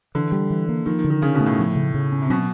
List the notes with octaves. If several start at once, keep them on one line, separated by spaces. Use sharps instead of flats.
D3 E3
G3
E3
A#3
D#3 F3
D#3
D3
D#3
C#3 C#4
B2
A3
A2
F3
C#3
C#3
C#4
C3
B2 F#3